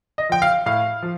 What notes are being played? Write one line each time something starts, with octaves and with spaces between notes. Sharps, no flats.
D#5
F3 G5
F5
A2 F5
F3